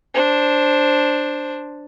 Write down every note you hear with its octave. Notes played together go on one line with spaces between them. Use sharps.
D4 C5